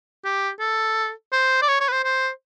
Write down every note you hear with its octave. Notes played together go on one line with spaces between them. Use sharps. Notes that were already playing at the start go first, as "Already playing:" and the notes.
G4
A4
C5
D5
C#5
C#5
B4
C5
C5